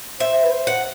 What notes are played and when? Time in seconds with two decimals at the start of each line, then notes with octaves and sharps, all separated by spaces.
0.20 C5 E5
0.43 B4
0.51 C5
0.67 F#5